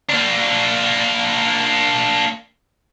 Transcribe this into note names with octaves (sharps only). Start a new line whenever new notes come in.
A#3 D4